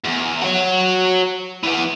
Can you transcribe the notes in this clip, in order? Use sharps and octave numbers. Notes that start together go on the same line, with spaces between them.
E2
F#4 C#5
E3 B3